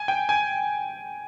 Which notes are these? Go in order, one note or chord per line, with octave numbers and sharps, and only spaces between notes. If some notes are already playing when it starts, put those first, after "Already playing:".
Already playing: G#5
G5
G#5